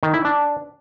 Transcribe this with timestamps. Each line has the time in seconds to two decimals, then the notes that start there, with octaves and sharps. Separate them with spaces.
0.03 D#3
0.14 E4
0.25 D4